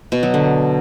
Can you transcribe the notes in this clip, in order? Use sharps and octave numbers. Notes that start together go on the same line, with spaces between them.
B2
F#3
D3